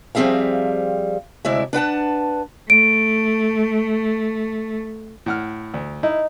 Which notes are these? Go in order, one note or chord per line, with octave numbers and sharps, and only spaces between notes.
F3 G3 C4 G#4 E5 F5
D2 C3 G#3 E4 D5 E5
D4 B4 F#5 A5
A3 D7
A2 F#5 F6
D2
D#4 E4